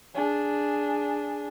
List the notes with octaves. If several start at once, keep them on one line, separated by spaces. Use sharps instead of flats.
D4 G#4